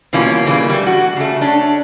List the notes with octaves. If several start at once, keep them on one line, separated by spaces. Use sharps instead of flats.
B2 E3 G3 A#3 C#4 F4
C#3 E3 G3 A#3
G3 A3
F#4
C#3 A3
C#4 D4